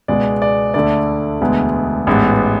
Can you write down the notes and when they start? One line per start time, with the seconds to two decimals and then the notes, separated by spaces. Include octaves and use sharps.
0.08 C#2 B2 G#3 B3 D5
0.42 D5
0.74 D2 D3 A3 D5
1.41 E1 D2 D3 G#3 B3
2.07 A1 G#2 G#3 B3